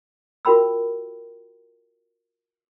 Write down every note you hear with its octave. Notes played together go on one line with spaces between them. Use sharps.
F4 F#4 A#4 G5 B5 E6